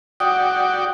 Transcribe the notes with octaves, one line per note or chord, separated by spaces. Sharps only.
F#4 D5 F#5 G5 D#6